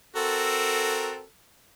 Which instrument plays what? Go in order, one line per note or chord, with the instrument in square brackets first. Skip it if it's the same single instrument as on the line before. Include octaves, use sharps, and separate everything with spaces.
[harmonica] C4 F#4 A#4 [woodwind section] A4